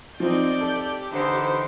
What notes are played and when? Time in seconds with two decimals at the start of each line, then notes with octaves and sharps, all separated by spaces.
0.20 F3 C4 D#4 C5 D5 G6
0.61 G4 A4
1.12 D3 E3 D#4 C5